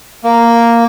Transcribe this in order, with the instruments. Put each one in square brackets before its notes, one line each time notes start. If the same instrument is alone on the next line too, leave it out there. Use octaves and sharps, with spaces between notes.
[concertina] A#3